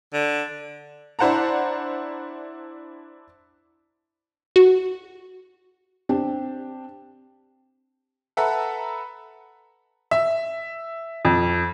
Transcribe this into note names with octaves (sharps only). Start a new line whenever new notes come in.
D3
D4 E4 C5 F#5 A5 A#5
F#4
C4 D4 G4
A4 B4 E5 F#5 A#5 B5
E5
F2